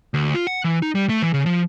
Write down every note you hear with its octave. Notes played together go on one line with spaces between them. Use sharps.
D2
F4
F#5
E3
D#4
G3
A3
E3
C#3
F3